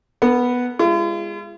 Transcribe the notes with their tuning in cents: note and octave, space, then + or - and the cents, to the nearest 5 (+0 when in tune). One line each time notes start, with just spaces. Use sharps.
B3 +0 A#4 -40
G#3 -25 F4 -45